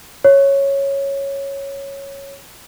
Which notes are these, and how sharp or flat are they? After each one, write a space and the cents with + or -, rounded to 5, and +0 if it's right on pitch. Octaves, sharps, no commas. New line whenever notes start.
C#5 -5